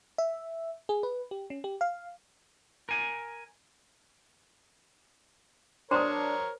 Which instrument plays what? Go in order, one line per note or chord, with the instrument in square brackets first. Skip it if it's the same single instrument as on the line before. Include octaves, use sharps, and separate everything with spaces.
[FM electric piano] E5
G#4
B4
G4
C#4
G4
F5
[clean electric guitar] A#4 G#5
[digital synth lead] D4 [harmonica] A#4 C#5 [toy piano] C5 A#5 [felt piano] C6 D#6